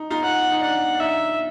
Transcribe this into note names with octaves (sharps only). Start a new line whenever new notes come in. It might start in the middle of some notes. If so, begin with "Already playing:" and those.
Already playing: D#4
D#4 F4
F#5
D#4
D4 F#5
D4
D#4 E5